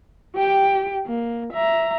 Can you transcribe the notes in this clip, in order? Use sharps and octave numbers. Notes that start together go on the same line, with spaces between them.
G4 G5
A#3
E5 A#5